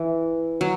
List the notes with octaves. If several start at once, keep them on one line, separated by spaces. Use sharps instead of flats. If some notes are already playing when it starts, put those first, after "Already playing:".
Already playing: E3
F#3